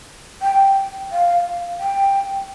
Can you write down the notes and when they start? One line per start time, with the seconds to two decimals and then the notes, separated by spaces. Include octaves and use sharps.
0.42 G5
1.12 F5
1.80 G5